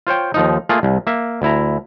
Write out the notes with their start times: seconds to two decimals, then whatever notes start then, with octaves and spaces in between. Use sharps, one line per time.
0.07 F4 C5 C#5 G5
0.34 D#2 F3 D#4
0.69 A3 A#3 F4 G#4
0.83 C2
1.07 A#3 E5
1.42 D2 E4 A#5